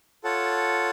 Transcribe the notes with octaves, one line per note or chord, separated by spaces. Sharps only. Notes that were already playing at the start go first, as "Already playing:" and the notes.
F4 A4 C#5 F#5 A5